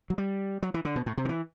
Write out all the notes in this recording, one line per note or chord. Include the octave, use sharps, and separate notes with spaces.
F#3
G3
F#3
E3
D3
B2
A2
C3
D3
E3